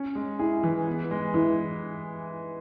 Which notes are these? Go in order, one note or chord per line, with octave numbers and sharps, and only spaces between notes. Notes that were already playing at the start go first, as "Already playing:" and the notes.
Already playing: C#4
G#3
E4 G#4
E3
B3
G#3
E3 E4